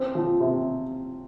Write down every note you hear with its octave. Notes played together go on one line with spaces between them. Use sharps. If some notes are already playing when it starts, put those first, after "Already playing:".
Already playing: C4
F3
C3